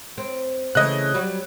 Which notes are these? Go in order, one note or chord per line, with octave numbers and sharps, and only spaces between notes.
C4
C#3 E3 A3 D#5 F#6
F#3 G3 F#4